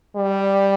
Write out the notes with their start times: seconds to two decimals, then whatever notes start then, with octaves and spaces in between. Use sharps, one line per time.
0.16 G3